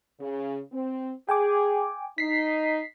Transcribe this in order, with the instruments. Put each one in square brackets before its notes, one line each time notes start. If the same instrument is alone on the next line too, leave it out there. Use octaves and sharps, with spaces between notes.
[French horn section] C#3
C4
[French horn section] G#4 [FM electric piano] G5 G#5 D6
[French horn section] D#4 [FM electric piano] B6 C7